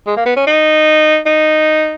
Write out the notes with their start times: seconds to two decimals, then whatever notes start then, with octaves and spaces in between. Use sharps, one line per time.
0.07 G#3
0.17 A#3
0.26 B3
0.37 C#4
0.47 D#4
1.26 D#4